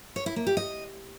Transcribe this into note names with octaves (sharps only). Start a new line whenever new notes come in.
C#5
E4
A#3
G4
D#5